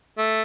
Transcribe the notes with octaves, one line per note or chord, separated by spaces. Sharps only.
A3